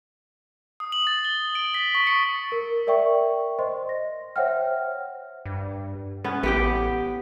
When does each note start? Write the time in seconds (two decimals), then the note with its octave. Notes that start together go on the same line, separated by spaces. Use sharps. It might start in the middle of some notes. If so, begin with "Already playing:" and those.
0.80 D#6
0.92 F#7
1.07 A6
1.25 G7
1.55 D7
1.74 B6
1.95 C#6
2.07 C#7
2.52 A#4
2.87 A#4 D5 E5 G5 C#6
3.59 C5 D#5 C6
3.89 A#6
4.36 C5 C#5 E5 F#5 G5 F6
5.45 G2
6.24 B3 C#4
6.43 A1 B3 G4 G5